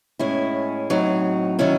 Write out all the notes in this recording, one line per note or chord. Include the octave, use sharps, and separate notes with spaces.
A2 G#3 C#4 E4
A2 F#3 C4 D#4
D#3 F#3 C#4 E4